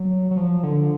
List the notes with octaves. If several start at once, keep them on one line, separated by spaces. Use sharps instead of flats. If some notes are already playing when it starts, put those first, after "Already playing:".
Already playing: F#3
F#3
F3
D3